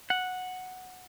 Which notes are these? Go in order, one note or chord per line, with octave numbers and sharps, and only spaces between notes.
F#5